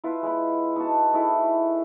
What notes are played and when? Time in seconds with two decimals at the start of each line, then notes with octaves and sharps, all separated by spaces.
0.04 E4 F4 B4
0.23 G#3 B5
0.76 D#4 F#4 A5
1.13 A3 D#4 E4 G#4